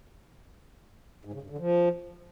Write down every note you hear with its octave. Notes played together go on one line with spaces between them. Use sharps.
G#2
C#3
G2
D3
F3